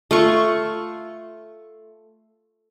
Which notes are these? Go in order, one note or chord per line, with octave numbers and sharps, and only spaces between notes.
A3 F4 C#6